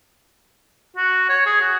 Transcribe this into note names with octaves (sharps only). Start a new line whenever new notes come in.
F#4
C#5
G#4
F#4